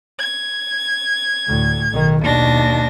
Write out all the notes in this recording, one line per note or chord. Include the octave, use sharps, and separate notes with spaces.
G#6
D2 A2
B1 D#3
D#2 B2 D4 A#6